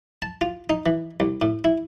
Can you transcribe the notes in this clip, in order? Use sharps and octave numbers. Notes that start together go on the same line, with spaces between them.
A5
F4
D#4
E3
C2
A2
E4